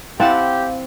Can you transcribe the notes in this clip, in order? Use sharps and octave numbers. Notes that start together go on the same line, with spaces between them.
C4 E4 G4 F5 F#5 A5